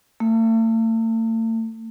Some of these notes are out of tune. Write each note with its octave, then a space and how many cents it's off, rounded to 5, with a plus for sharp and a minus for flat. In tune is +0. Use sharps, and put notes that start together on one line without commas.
A3 +45